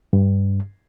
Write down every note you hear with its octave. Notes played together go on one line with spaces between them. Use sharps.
G2